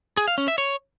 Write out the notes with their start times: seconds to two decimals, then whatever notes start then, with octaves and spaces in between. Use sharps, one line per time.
0.17 G#4
0.28 F5
0.38 C#4
0.48 E5
0.58 C#5